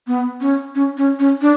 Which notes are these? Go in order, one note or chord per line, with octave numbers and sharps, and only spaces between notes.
B3
C#4
C#4
C#4
C#4
D4